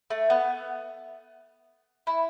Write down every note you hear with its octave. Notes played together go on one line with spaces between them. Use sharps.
A3
B3
E4